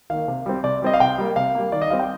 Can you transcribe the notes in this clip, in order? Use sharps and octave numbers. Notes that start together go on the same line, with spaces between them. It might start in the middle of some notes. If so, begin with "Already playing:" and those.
D#3 A#3 F5
C3
G3 C4
C3 D5
G3 C4 D#5
F5
C3 G5
G3 A#3
C3 F5
G3 A#3
D#3 D5
D#5
G3 C4 F5
G5